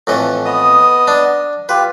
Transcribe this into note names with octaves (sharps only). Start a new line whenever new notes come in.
F2 A2 E3
B3 D#5 D#6
D4
F4 G4 B4